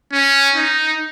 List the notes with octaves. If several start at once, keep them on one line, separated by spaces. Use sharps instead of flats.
C#4
D#4